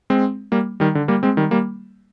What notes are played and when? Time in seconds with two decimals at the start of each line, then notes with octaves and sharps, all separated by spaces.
0.10 G#3 C4
0.52 G3 A#3
0.80 D#3 G3
0.95 D3
1.08 G3 A#3
1.23 G#3 C4
1.37 D#3 G3
1.51 G3 A#3